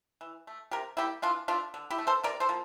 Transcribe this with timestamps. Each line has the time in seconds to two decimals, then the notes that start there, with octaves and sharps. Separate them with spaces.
0.21 E3
0.47 A3
0.71 C3 G4 A#4
0.97 G3 A#3 E4 G4
1.22 E3 D4 F4
1.48 A3 D4 F4
1.74 D3
1.90 E4 G4
1.98 A3
2.07 A4 C5
2.24 C3 A#4 D5
2.40 A4 C5
2.49 F3 A#3